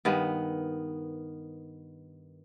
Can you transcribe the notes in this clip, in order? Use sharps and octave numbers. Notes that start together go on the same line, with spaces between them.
G2 D#3 B3